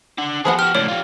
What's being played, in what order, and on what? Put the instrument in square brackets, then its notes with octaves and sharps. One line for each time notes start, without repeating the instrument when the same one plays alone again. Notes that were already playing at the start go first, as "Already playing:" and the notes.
[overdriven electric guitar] D4 F#5
[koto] F3 B3 F#5 [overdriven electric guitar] G3 G#4
[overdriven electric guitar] F#4 G4 [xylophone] F6
[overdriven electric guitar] C#2 A2 [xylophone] C#5 [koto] D5
[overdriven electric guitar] F4 G4